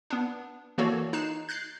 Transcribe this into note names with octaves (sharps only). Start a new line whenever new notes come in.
B3 D4
E3 A#3 F#4 A4 C#5 D5
D#4 F#6 C7 E7
F#6 G6 A6 C7